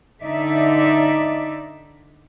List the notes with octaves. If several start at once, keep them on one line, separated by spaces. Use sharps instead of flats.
D3 D#4 D5 E5